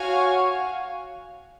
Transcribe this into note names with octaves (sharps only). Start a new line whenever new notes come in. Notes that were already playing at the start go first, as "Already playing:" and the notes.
Already playing: F#4 C#5 F5 G#5